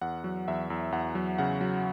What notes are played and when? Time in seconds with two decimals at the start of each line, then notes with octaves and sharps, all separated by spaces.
0.01 E2 F#5
0.24 F#3
0.48 E2 E5
0.70 E2
0.92 E2 F#5
1.15 F#3
1.38 C#3 F#5
1.61 F#3